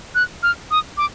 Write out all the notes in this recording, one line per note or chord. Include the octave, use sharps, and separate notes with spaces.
F#6
F6
D#6
D6